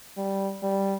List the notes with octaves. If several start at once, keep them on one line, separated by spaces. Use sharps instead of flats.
G3
G3